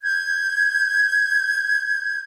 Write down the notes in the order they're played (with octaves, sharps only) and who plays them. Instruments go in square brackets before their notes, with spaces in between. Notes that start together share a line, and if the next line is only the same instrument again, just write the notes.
[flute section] G6 G#6